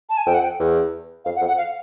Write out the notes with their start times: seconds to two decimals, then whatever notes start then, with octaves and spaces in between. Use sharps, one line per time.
0.09 A5
0.17 G#5
0.26 F2 G5
0.34 F#5
0.43 G5
0.59 E2
1.25 F2 F5
1.36 F#5
1.41 F2
1.48 F#5
1.58 F5